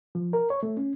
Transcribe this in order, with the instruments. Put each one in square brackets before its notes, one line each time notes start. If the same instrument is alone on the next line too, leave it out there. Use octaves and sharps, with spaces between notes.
[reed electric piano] F3
A#4
C#5
A3
C#4